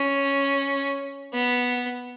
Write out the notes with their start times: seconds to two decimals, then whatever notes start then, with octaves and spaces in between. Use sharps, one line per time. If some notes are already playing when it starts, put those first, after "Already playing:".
Already playing: C#4
1.33 B3